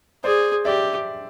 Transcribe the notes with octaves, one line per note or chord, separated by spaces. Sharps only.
G#4 C5 D5
G4 D5 E5